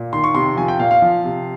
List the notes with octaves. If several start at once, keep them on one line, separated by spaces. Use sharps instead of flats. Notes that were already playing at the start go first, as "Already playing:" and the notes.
Already playing: A#2
D#3 C6
C#6
C3 C6
F3 G#5
G5
A#2 F5
F5
F3
C3